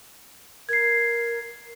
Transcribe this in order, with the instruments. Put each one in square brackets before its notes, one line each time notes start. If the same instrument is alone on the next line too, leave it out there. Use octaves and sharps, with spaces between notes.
[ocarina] A#4 [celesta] G#6 C7